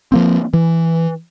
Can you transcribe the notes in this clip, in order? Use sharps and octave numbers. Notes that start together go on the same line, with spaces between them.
F3 A#3 C4
E3